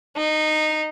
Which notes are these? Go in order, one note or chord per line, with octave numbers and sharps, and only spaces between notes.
D#4